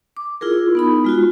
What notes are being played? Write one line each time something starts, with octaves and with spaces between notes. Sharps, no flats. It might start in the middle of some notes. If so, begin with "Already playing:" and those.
D6
E4 F4 G#4 A#4
B3 D#4 B5
G#3 F4 F#4